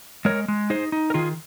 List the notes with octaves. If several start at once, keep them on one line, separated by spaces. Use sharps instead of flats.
G#3 A#4 C#5
G#3
D#4 G#4 C5
D#4
A#4
D#3 F4 G#4